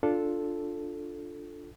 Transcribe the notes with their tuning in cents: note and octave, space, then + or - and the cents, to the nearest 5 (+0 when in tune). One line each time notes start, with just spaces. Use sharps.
D4 +0 F4 +0 A4 +0